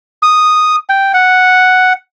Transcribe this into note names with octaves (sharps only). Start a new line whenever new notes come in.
D#6
G5
F#5